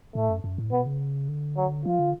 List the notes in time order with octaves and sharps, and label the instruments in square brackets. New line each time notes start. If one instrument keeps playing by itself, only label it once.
[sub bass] A2 [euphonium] A3
[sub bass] F#2
F#2
A2
[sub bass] B2 [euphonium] B3
[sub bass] C#3
D3
[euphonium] F#3
[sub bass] F3 [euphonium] F4
[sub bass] D3